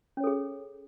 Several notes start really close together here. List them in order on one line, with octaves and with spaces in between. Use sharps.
C#4 C#5 A4 G#4